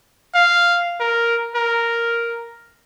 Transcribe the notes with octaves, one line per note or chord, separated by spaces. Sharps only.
F5
A#4
A#4